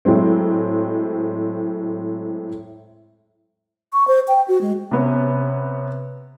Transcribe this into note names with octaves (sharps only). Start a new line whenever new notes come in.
A2 F#3 G#3 C4
C#6
C5
G5
F#4
G#3
C3 B3 C#4